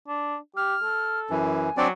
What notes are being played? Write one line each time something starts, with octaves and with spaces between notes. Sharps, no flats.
D4
G4 F6
A4
F#2 E3 G#5
F#3 C4 D4 D5